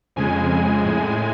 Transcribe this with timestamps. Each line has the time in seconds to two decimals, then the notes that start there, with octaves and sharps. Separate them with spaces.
0.16 F2 C#3 G#3 G#5
0.49 G#5
0.82 A2 G#3